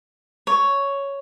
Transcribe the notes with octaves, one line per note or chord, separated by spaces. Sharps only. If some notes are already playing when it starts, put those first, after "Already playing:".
C#5